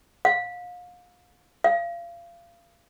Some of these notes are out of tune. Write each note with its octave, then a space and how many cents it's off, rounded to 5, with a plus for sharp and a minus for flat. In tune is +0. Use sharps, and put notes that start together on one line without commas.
F5 +35
F5 -30